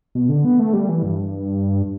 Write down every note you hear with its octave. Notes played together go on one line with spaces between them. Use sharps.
B2
D3
B3
A3
G3
E3
G2